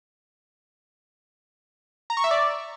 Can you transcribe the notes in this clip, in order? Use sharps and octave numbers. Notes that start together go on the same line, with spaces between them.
A#5
C#6
E5
D5